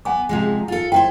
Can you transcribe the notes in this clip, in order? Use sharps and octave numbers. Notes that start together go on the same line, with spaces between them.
B3 F#5 G#5 D6
C3 F3 G#3
F4 A4
E4 B4 C5 G5